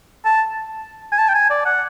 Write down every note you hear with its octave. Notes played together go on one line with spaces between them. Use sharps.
A5
G#5
A5
G5
G#5
D5
F#5